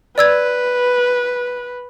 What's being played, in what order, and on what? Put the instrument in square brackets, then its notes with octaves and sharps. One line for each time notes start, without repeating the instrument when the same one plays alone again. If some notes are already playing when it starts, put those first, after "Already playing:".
[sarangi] B4 [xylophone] D5 E6 G#6